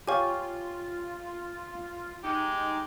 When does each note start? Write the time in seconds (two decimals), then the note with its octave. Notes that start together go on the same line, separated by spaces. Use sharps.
0.08 F4 G4 C#5 F5 G#5 C#6
2.23 G#3 D#4 G4